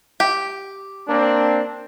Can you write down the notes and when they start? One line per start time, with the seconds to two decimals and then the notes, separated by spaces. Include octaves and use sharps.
0.20 G4
1.08 A#3 C4 D4